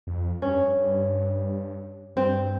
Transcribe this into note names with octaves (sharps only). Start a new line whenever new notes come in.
F2
G2 C#4
G2
G2 C4